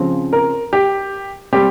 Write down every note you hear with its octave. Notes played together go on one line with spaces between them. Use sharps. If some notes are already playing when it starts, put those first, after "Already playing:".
Already playing: C#3 F3 C4
A#4
G4
G3 C4 G4